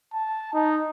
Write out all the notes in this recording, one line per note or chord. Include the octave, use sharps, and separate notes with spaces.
A5
D#4